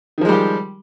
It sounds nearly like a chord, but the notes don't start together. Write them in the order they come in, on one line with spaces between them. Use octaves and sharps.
D#3 F3 G#3 G3 G4